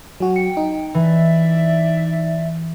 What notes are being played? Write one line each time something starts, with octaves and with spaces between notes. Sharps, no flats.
F#3 F#4 G#5
G5 C#7
D#4
E3 D5 E5